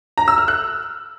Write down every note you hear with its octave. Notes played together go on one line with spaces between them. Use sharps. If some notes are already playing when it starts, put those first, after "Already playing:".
A#5
E6
F6
F#6